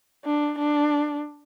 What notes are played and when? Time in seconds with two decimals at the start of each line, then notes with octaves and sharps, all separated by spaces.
0.24 D4
0.58 D4